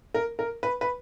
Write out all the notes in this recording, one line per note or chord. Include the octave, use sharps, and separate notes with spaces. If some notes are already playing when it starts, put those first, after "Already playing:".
A#4
A#4
B4
B4